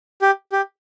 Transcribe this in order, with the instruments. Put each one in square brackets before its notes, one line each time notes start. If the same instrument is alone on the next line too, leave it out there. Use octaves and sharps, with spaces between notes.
[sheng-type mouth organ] G4
G4